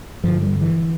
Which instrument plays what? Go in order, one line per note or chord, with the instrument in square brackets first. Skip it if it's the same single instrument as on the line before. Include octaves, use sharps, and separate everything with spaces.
[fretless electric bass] G2 D3 F3
G3
E3